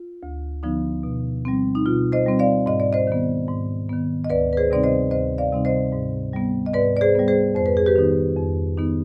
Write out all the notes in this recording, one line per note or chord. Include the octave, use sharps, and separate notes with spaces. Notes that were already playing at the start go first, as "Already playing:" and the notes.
Already playing: F4
D2
D3 F3 B3 D#4
B2
G3 C4
D#4
B2 F4
C5 D#5
G3 C4
D5 F5
G#2 D#5
D5
C5 D#5
D#3 B3
G#2
D#3 B3
D#5
D2 B4 D5
B4
G#4 C5
C3 G3 C4 D#4 D5
C5 D#5
D2 C5 D#5
D5 F5
C3 G3 C4 D#4
C5 D#5
G#2
G3 B3
D#5
G#2 B4 D5
D5
G#4 C5
G3 B3
G#4 C5
F2 C5
B4
G#4
G4 B4
D#3 B3 D#4
F2
D#3 B3 D#4